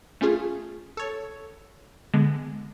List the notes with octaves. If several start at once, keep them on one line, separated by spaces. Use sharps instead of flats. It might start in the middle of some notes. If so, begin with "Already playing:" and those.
A3 C#4 F4 G#4
A4 C#5
D3 G#3 B3